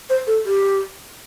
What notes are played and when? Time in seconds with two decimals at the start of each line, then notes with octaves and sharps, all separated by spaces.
0.10 C5
0.27 A4
0.46 G4